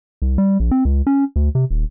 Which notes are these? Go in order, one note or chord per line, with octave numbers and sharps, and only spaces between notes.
C2
G3
A#1
C4
C#2
C#4
D2
C3
D#1